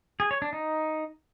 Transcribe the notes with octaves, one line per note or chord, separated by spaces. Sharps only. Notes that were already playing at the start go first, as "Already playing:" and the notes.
G#4
C#5
D4
D#4